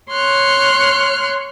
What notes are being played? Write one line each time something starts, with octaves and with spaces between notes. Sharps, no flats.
C#5 C6 F6 F#6